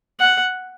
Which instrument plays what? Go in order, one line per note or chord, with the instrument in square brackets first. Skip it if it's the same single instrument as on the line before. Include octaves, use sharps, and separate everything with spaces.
[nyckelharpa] F#5